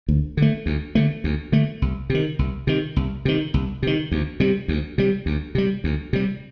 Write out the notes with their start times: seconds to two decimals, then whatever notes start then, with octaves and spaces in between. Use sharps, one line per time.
0.08 D2
0.37 D3 A3
0.66 D2
0.95 D3 A3
1.24 D2
1.52 D3 A3
1.82 C2
2.10 C3 D#3
2.39 C2
2.67 C3 D#3
2.96 C2
3.25 C3 D#3
3.54 C2
3.83 C3 D#3
4.12 D2
4.40 C3 G3
4.68 D2
4.98 C3 G3
5.26 D2
5.55 C3 G3
5.84 D2
6.13 C3 G3